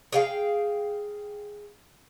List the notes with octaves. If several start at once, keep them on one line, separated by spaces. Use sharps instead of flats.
G#4 F5 G5